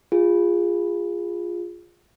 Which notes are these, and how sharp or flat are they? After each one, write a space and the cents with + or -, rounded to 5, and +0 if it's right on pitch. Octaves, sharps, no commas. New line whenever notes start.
F4 +0 G#4 -20